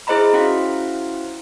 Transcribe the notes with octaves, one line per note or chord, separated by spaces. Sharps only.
E4 G#4 C5 D#5 A#5 B5
C#4 E4 F#4 C5 F5